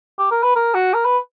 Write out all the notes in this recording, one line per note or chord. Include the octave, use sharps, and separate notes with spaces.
G4
A#4
B4
A#4
F#4
A#4
B4